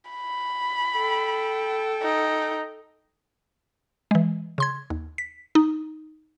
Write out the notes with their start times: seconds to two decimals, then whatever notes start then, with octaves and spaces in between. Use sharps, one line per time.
0.11 B5
0.97 A4 G5
2.03 D#4
4.11 E3 G#3
4.58 C#3 C6 G#6
4.90 D#2
5.18 B6
5.55 D#4